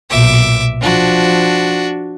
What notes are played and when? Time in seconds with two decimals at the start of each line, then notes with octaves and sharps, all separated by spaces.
0.10 B1 A#2 E5 D6
0.82 F3 D4 F#4